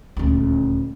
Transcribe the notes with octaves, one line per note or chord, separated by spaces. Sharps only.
D#1 D2